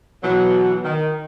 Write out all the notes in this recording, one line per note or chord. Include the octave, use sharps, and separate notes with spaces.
B2 E3 F#3
D#3